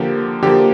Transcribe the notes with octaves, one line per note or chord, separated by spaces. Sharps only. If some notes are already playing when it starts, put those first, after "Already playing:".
Already playing: D3 F3 A#3 G4
D3 F3 A#3 G4